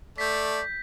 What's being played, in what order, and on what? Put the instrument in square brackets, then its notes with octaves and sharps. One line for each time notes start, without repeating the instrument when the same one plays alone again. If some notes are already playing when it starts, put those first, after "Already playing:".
[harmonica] A3 [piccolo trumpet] D5 [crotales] G6 B6